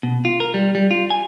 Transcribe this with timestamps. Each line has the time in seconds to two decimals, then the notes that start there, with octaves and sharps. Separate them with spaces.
0.03 B2
0.25 F4
0.40 A#4
0.54 G3
0.75 G3
0.91 F4
1.10 G#5